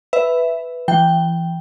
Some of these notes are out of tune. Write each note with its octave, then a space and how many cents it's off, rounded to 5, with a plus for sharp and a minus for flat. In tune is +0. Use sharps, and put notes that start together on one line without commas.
B4 +5 E5 +0
E3 +25 G5 +0